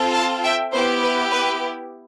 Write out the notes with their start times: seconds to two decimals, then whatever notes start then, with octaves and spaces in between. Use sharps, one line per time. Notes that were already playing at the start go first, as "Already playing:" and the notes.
Already playing: C4 F4 A4
0.14 F5 A5
0.43 E5 G5
0.73 B3 E4 G4 C5
1.02 B4
1.31 B4